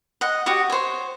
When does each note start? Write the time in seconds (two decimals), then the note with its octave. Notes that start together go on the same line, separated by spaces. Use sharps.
0.21 D#5 F#5
0.46 F#4 G4 C#5 D#6
0.70 C5 C#5